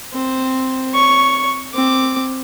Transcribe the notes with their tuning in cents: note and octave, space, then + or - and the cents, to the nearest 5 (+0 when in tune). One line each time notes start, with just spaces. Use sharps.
C4 +0 C5 +0
C#5 +20 C#6 +0
C4 +0 D6 +0